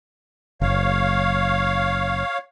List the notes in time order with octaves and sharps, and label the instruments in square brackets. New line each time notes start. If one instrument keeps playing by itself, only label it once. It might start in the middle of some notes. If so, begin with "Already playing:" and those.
[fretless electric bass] F#1 [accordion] C#5 F5